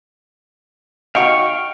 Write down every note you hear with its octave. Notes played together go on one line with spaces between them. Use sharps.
D#4 F#4 D#5 F5 G5 C#6